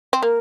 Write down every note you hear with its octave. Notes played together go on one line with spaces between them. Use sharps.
C4
A#3 A#4